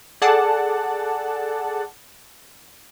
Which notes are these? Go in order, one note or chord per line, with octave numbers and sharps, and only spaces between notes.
G#4 A4 D5 F#5 A5